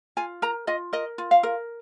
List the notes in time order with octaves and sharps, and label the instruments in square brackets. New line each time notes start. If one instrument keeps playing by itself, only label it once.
[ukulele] F4 G#5
A#4 A#5
F4 D#5
A#4 D#5
F4
F5
A#4